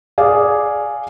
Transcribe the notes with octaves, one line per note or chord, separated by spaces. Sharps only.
G#4 D5 F5